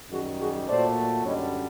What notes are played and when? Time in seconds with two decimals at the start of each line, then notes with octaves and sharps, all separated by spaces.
0.10 F#2 D#3 G3 F#4 G#4
0.39 F#4 G#4
0.67 A#2 F#3 A3 C5 D5
1.24 F#2 D3 G3 C#5 D#5